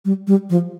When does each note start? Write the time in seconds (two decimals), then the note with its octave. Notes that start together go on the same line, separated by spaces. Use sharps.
0.05 G3
0.27 G3
0.50 F3